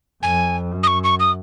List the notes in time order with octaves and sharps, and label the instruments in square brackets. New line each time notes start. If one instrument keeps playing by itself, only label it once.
[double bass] F2 [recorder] G#5
[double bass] F#2
[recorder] D#6
C#6
C#6
D#6